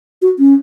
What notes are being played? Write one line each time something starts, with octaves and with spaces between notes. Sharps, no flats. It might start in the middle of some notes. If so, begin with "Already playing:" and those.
F#4
C#4